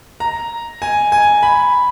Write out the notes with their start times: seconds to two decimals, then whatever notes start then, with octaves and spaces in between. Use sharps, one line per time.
0.20 A#5
0.82 G#5
1.12 G#5
1.43 B5